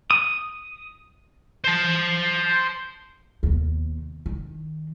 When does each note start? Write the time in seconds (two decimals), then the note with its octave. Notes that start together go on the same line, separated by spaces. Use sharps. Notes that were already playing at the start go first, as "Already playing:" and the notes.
0.11 D#6
1.64 C5 A5
3.43 D#2 B2
4.26 D#3